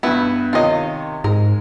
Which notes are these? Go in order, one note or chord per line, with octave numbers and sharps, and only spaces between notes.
G2 B3 E4 F#4 B4
C3 D#3 F4 C#5 D#5
G#2 G#3 A#4